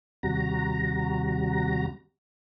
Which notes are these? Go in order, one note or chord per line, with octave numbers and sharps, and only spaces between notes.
D#2 C3 G3 F#4 A#5